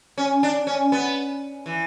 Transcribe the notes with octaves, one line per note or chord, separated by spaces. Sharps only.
C#4
D4
C#4
B3
E3